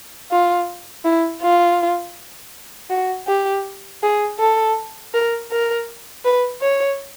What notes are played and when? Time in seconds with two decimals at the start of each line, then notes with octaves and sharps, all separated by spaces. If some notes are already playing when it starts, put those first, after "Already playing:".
0.31 F4
1.05 E4
1.42 F4
2.90 F#4
3.27 G4
4.02 G#4
4.39 A4
5.14 A#4
5.51 A#4
6.25 B4
6.61 C#5